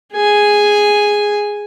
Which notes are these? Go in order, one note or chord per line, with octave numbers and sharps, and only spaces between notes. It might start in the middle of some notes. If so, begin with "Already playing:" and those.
G#4 G#5